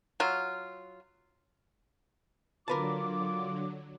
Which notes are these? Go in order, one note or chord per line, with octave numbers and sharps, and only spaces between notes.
F#3 F4
D3 F#3 F4 A#4 B4 A5 D6